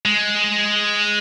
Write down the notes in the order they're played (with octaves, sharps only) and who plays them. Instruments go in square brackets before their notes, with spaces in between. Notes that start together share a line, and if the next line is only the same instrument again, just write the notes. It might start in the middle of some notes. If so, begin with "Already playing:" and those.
[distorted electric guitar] G#3